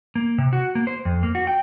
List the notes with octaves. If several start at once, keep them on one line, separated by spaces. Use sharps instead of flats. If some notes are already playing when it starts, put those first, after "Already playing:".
A#3
C3
F#4
A#3
C5
F2
A#3
F#4
G5